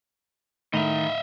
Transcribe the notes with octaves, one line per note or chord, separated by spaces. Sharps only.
A2 D#3 D#5 E5 F7